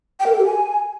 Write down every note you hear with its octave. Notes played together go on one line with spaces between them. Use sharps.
G5
A#4
A4
G4
G#5